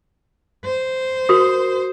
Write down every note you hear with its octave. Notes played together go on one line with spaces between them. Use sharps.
C5
F#4 A#4 D#6